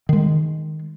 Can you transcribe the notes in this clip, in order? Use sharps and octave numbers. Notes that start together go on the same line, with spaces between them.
D#3 G#3